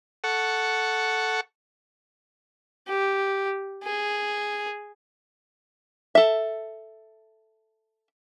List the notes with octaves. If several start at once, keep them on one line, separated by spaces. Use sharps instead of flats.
A4 F#5 C#6
G4
G#4
A4 E5